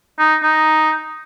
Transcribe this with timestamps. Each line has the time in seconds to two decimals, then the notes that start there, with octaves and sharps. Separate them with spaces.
0.19 D#4
0.43 D#4